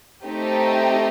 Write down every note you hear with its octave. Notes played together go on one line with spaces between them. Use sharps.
A3 C4 D#4 G4